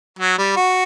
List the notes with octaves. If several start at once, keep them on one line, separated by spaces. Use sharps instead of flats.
F#3
G3
F#4